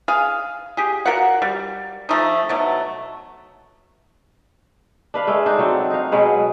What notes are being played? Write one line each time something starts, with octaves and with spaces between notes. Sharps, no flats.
G#4 F5
G4 G#4
F#4 A#4 F5 F#5
G3
F3 A3 D#4
B2 F#3 A3
D4 B4 F5
G#3 A3
D4 D#4
F#3 C4
D#4 F5
B2 F#3 G#3 B4